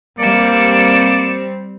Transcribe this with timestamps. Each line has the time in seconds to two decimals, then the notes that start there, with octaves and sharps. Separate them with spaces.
0.19 G3 A#3 C4 D5 C#7 E7